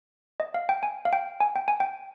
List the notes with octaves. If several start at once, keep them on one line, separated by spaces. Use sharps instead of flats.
D#5
F5
G5
G#5
F5
G5
G#5
G5
G#5
G5